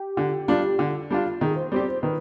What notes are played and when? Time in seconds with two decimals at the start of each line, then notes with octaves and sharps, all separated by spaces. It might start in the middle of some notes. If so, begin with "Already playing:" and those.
Already playing: G4
0.17 D3
0.48 G3 D4 F4
0.79 D3
1.10 G3 D4 F4
1.41 D#3 G#4
1.56 C5
1.72 G3 C4 G4 D5
1.88 C5
2.03 D#3 B4